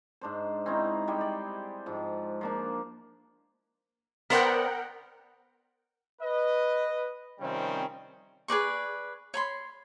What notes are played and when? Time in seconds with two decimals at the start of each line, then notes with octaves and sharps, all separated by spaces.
0.21 G#2 D4 C5
0.66 C4 C#4 D#4 E4
1.08 G3 G#3 G4 G5
1.21 D5
1.86 G#2 F3
2.41 F3 A#3 D4
4.30 B3 A#4 C5 D5 F#5 G5
6.22 B4 D#5
7.40 C3 D#3 F3 G3 C4 C#4
8.48 G#4 B4 D5 C#6
9.34 C#5 B5 C6